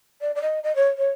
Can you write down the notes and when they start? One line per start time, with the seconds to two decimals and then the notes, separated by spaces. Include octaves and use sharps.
0.21 D5
0.35 D5
0.42 D#5
0.63 D#5
0.75 C#5
0.97 C#5